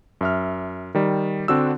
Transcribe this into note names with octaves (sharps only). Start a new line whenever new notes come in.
F#2 E5 F6
D#3 G3
D3 C4 D4 F#4 E6